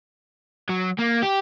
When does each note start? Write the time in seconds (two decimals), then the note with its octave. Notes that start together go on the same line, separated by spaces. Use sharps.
0.69 F#3
0.99 A#3
1.22 G4